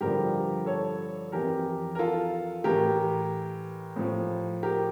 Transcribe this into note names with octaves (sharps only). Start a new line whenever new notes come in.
G2 D3 F3 G4 A#4
A4 C#5
F2 E3 G4 A#4
A#4
F4 A4
A2 E3 G4 A#4
A2 F3
G4 A#4